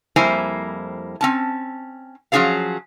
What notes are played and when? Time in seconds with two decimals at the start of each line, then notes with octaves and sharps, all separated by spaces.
0.16 F2 G3 A#3 E4 C5 G#5
1.21 C4 C#4 A5
2.32 F3 F#3 C#4 G#4 A4 F5